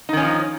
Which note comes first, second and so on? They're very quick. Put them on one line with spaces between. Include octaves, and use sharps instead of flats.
D#4 D#3 C#4 F3